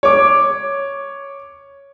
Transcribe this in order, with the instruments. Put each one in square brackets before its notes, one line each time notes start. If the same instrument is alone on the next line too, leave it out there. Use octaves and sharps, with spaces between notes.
[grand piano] C#5 D6